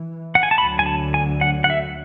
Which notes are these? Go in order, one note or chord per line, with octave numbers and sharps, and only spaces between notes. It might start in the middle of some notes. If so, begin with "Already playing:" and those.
Already playing: E3
F#5
G#5
A5
D2 D3 F#3 B5
G#5
A5
G#5
F#5
F#5
E5